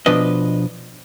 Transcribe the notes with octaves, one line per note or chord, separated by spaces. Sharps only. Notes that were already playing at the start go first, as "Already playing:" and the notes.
B2 F3 D4 B4 D#5